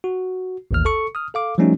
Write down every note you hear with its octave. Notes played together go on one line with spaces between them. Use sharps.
F#4
A1 D#2 F6
A4 C#6 C#7
D#6 F6
A4 F5 D6
F3 G3 A3 C#4 D#4 F#4